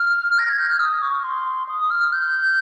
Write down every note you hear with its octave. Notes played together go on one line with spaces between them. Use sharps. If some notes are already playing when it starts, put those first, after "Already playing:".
Already playing: F6
A#6
G#6
G6
F6
D#6
C#6
C6
D#6
F6
G6